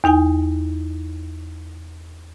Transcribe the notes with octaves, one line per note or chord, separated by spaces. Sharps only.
E2 D#4 G5 G#5